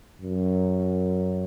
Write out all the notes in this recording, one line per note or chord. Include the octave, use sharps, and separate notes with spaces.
F#2